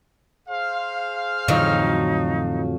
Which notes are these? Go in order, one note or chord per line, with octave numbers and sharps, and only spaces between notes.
G#4 C5 F5
F2 A2 D3 E3 F#3 D#4